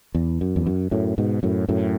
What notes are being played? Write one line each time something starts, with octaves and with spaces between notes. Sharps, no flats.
E2
F#2
E2
F#2
F#2 A2
G#2 B2
F#2 A2
F#2 A2